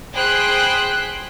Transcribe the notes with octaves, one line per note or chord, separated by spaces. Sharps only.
G#4 C5 G5 B5 F#6